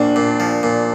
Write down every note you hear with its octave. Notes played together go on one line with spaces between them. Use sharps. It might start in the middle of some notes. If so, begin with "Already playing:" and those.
Already playing: A#1 A#3 D4
A#2
F3
A#2